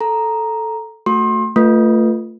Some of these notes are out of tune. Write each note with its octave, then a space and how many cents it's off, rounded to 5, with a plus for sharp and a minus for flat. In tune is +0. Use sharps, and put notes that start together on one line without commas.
A4 -5 A#5 +5
A3 +10 F#4 -20 C6 +30
A3 +25 F4 +0 B4 +0